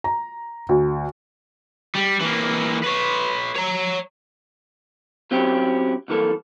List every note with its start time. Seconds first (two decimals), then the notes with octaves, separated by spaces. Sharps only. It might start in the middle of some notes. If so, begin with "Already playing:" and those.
0.04 A#5
0.69 D2
1.95 G3
2.20 E3 A#3
2.83 B4 C#5
3.56 C#5 A#5
5.31 F#3 C4 C#4 E4 G4
6.08 C2 F#2 E3 A#3 A4